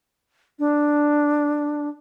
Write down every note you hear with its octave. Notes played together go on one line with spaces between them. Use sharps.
D4